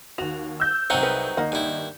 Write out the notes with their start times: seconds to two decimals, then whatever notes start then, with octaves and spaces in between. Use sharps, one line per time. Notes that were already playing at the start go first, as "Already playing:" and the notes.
0.18 D#2 F#4 F7
0.60 E6 G6
0.90 C2 F#3 C4 D#4 F#5 C#7
1.03 G#4 A#4 B4
1.37 D#2 A#3 D#4 F#5
1.52 G2 E4